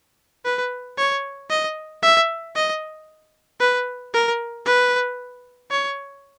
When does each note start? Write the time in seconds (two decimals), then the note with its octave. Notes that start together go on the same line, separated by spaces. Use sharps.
0.45 B4
0.98 C#5
1.50 D#5
2.03 E5
2.55 D#5
3.60 B4
4.14 A#4
4.66 B4
5.71 C#5